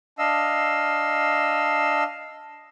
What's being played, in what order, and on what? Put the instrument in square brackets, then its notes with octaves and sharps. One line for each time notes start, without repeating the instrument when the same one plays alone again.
[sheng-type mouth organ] D4 D#5 F5 E6